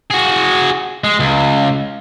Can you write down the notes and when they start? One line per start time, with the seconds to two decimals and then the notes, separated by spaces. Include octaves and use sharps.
0.11 F#4 G#4
1.04 G#3
1.20 C#2